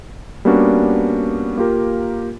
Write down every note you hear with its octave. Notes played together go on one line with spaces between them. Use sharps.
G3 A#3 B3 C#4 D4 F#4
A#3 F4 G4 A#4